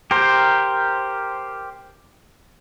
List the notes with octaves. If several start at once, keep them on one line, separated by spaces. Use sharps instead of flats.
G4 A#4 C5